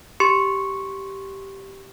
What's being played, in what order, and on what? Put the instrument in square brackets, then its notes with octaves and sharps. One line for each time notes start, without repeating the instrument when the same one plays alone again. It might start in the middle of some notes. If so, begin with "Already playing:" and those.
[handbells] G4 C6 C#6 C#7